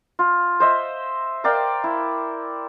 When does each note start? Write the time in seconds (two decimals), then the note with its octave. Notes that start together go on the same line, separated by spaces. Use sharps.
0.19 F4
0.60 C5 D#5 E5
1.44 A#4 D5 F5 G5
1.84 E4